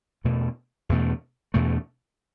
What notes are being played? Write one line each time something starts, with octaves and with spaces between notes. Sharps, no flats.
E2 B2 A3
E2 B2 A3
E2 B2 A3